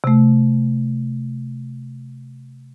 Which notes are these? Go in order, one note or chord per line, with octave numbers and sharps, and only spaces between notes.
C3 A3